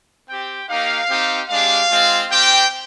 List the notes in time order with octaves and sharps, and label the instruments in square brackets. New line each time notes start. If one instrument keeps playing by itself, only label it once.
[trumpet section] C4 G4 G5
A#3 D#4 G4 F5
C4 D#4 G4
G#3 D4 G4 F5
G#3 C4 F4
C4 G4 G5